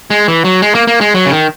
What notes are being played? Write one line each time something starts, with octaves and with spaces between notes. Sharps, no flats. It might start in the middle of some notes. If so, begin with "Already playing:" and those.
G#3
E3
F#3
G#3
A#3
A#3
G#3
F#3
C#3
D#3